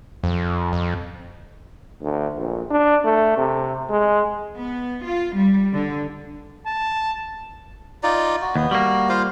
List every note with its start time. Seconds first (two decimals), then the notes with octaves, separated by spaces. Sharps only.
0.24 F2
0.73 F2
2.01 D2
2.36 A#1
2.70 D4
3.04 A3
3.37 C3
3.89 G#3
4.56 B3
5.05 F4
5.35 G3
5.73 D3
6.67 A5
8.03 D#4 F4 D5
8.42 F#4
8.56 D#2 B3
8.71 G3 A#3 F#4
9.09 F4 C5 F5